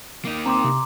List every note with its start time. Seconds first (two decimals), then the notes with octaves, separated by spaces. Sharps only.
0.25 A#3 D#4
0.46 C4 A#5 C6 D6
0.64 C3